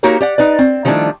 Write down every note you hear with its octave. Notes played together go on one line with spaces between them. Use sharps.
A#3 D#4 F#4 G4 A#4 C#5
G4 D5 F#5
D#4 B4 D5
C4
D#3 F3 G3 A3 D4 E4